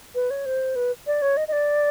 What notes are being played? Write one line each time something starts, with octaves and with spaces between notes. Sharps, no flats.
B4
C#5
C5
B4
D5
C#5
D#5
D#5
D5